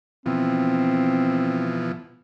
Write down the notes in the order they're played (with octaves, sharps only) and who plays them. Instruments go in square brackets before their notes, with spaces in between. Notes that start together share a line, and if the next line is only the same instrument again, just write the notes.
[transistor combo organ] B2 E3 F3 [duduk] C4